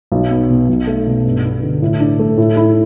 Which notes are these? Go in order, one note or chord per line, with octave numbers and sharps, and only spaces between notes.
B1
B3
B2
B1
A3
B2
G2
B3
D3
A2
D4
A3
A2
E4